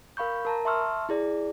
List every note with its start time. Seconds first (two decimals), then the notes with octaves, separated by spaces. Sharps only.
0.17 A#4 F5 B5 C#6 G6
0.45 A#4 A5 A#5
0.65 E5 A5 C6 C#6 E6 F6
1.09 E4 G#4 D5